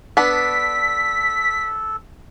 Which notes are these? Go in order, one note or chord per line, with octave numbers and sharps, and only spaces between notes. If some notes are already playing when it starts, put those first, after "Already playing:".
B3 D4 A4 B6